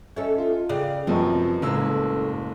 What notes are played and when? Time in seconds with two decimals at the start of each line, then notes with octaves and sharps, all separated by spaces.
0.16 C#4 A4 D#5 E5
0.38 F4
0.69 C#3 G#4 D5 G5
1.07 F#2 C3 F3 B4 D#5 A5 C#6
1.62 F#1 F#2 A2 G#3 E6